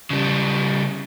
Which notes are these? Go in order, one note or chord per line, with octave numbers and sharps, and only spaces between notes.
C#3 G3